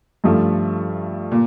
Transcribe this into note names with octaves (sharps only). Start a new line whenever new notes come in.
G2 F3 A3
A#2